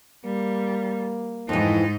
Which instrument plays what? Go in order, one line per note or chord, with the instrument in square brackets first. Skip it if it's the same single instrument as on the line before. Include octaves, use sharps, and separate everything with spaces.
[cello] G3 [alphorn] A#3
[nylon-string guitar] F2 E3 [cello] G#2 D#4